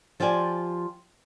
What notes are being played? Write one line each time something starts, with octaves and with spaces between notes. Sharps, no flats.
F3 F4 G4 D5 G#5